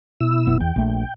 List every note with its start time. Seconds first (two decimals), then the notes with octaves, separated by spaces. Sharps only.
0.20 B2 E4 E6
0.47 F#1 B3
0.60 E2 G5
0.76 A#1 A3